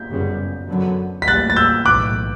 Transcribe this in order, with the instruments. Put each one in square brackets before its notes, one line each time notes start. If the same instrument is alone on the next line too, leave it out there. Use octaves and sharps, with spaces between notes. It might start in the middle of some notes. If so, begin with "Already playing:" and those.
Already playing: [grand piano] G6 B6
[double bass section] G1 F#2 C#3 G3 B3
F#2 D3 F#3 B3
[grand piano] B6
[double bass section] A1 A2 G3 [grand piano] F#6 A6
[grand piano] A6
E6 G6
[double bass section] B1 A2 E3 [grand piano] D6 F#6